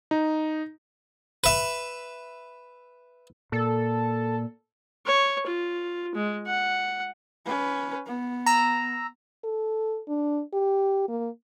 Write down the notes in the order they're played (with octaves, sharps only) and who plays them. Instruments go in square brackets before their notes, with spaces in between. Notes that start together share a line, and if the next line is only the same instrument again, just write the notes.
[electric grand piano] D#4
[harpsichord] B4 E5
[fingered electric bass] A#2 [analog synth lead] A4
[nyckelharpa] C#5
F4
G#3
F#5
[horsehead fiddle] C#4 B4
B3
[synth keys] A#5 E6
[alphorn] A4
D4
G4
A#3